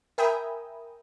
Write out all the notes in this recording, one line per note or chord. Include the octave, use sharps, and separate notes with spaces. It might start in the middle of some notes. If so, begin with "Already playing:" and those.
A#4 E5 G5 G#5 B5 D#6